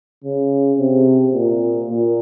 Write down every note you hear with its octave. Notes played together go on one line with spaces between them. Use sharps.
C#3
C3
A#2
A#2